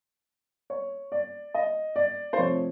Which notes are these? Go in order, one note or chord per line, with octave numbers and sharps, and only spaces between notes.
C#5
D5
D#5
D5
C5
C3 F3 A3 C#5